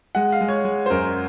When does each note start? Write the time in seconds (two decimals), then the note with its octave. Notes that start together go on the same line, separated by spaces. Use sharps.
0.15 G#3 F#5
0.32 F5
0.41 G#3
0.48 C#5
0.65 G#3
0.86 C5
0.90 F#2 A#4